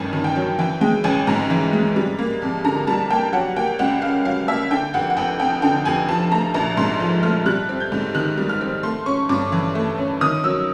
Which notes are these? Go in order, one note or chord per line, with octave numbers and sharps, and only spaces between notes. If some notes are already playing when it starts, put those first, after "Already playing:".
Already playing: A1 G2 D#3 G#5
D#3
G5
F#3
E3 G5
G#3 G5
A1 G#5
G#2 A#5
E3
G#3
G3
A#3
F2
D3 A#5
G3 A5
A#3 G5
F#3 F#5
A#3 G5
C#2 F#5
C#3 F5
F#3 F5
A#3 E5
D3 G5
F1 F#5
F#5
F1 G5
F2 G5
D3 G5
F1 G#5
F3 A5
A3 A#5
A#1 A#5
G#2 C6
F3
A3 F6
G3 F#6
C4
G6
G#2
D#3 F#6
G3
F6
C4
A3 C6
C#4 C#6
G2 D6
E3
A3
C#4
D#3 D#6
F#3 E6